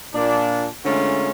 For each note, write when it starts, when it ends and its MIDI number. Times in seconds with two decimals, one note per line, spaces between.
0.14 0.66 46
0.14 0.66 62
0.85 1.31 50
0.85 1.31 56
0.85 1.31 57
0.85 1.31 61
0.85 1.31 65
0.85 1.31 70